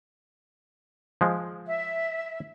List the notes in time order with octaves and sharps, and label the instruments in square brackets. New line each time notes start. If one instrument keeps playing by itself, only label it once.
[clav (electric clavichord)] F3 G#3
[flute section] E5